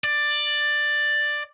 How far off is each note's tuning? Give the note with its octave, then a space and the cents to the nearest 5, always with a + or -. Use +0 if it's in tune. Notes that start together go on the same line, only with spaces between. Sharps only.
D5 +10